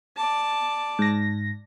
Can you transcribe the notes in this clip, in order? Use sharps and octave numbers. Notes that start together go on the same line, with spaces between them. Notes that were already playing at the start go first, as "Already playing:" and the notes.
D5 A5
G#2 A#6